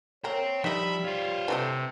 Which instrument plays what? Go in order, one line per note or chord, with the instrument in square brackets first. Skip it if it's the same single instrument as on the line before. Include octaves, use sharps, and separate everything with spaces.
[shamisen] A#3 A#4 [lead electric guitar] C5 G5 [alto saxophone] C#5
[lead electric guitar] F3 [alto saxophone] G3 [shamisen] D#4 D#5 [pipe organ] E5 B5
[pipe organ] F4 [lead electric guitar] C5 C#5
[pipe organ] C3 [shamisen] E3 A3 D#5